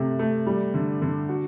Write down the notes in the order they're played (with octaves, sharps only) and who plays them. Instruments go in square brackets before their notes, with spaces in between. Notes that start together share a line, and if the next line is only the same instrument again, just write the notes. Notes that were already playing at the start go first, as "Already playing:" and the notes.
Already playing: [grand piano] C3 A3
A3
G3
D3
D3
F#4